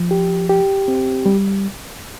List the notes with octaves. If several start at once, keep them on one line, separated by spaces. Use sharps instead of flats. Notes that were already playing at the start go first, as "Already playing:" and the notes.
Already playing: F3
G4
G4
C4
G3